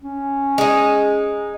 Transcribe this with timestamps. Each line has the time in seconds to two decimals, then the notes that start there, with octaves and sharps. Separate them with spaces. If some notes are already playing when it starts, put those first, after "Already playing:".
0.02 C#4
0.58 G#3 D#4